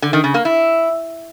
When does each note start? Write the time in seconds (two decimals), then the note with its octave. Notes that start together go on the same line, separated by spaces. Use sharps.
0.02 D3
0.13 D#3
0.24 C#3
0.34 A#3
0.45 E4